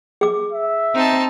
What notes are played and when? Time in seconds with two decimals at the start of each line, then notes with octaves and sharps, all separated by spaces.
0.21 G#4 D6
0.52 E5
0.95 C4 D#4 C5 A5